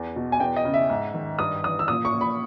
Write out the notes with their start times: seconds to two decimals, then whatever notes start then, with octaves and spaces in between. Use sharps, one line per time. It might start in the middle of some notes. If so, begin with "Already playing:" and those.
Already playing: E2
0.16 B2
0.32 G#5
0.40 E2 G5
0.56 D#5
0.65 C#3
0.74 E5
0.90 G#2
1.14 D#3
1.39 G2 D#6
1.64 E3 D#6
1.79 E6
1.88 A#2 D#6
2.05 C#6
2.13 A#2
2.21 B5